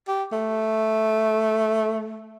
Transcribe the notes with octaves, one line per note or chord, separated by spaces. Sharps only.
G4
A3